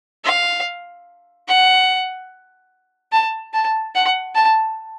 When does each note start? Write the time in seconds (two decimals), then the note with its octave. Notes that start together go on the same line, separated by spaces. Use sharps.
0.25 F5
1.48 F#5
3.12 A5
3.54 A5
3.95 F#5
4.35 A5